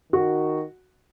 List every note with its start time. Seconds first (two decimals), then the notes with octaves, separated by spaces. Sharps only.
0.13 D#3 F#4